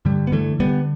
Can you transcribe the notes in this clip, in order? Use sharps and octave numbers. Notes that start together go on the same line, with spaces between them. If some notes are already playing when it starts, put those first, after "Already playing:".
G2 D3 G3
B3
D3 E3 A3
D3 G3 B3